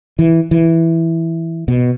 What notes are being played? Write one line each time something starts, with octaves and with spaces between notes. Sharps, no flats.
E3
E3
B2